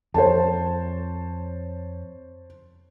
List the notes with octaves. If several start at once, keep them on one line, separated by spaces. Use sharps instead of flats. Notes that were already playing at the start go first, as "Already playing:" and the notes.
F2 C5 C#5 A5